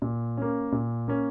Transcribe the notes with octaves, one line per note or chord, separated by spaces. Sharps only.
A#2
A#3 C#4
A#2
A#3 C#4